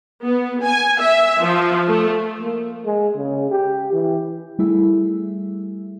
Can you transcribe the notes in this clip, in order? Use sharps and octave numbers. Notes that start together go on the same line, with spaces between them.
B3
G#5
E5
F3
A3
A#3
G#3
C#3
G4
E3
G3 A3 E4 G#4 E5